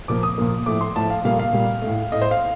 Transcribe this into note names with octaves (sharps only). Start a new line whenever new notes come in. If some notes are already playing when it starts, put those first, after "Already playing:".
A#2 F3 A#3 D6
D#6
A#2 F3 A#3
A2 F3 A3 D6
C6
A2 F3 A3 A5
F5
A#2 G3 A#3 F5
F5
A#2 G3 A#3
A2 A3
A2 A3 D#5
C5
F5